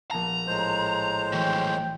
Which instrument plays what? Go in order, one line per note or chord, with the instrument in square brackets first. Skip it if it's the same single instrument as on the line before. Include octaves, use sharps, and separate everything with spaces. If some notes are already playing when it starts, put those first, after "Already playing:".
[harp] A#1 B3 A5 [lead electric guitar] A#5
[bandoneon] A2 G#3 C5 [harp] G6
[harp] E3 [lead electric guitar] F#3 A3 [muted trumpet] G5